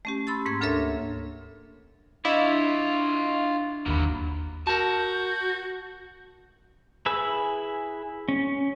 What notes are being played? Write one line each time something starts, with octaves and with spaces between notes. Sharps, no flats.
A3 C#4 G4
B5 C6 E6 A6
G#2 A#3 C#6 G#6
D2 D4 A4 A#4 C#5 E5
D4 E4 F4 C#5 D#5 F5
G1 D#2 F#3 A#3 B5
F#4 A#4 A5 G6
E4 G#4 B4 E6
C#4